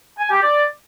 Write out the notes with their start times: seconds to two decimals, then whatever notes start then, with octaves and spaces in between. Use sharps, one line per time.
0.19 G#5
0.30 G4
0.42 D5